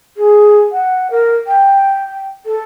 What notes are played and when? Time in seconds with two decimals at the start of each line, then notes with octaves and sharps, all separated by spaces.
0.17 G#4
0.72 F#5
1.11 A#4
1.47 G5
2.46 A4